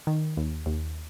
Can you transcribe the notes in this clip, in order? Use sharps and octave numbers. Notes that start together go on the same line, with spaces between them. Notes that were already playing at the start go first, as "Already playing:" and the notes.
D#3
D#2
D#2